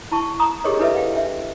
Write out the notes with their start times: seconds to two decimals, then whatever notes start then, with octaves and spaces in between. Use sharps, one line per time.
0.12 E4 A5 C#6
0.40 A#5 D#6
0.64 G4 G#4 A#4 C#5 D#5
0.79 D4 E4 A4 B4 D#5 E5
0.94 F5 G5
1.16 D4 E5